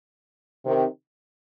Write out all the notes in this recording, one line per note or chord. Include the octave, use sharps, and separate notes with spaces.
C3 D#3